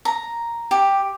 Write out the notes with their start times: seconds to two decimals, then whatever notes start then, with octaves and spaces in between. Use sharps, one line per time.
0.05 A#5
0.71 G4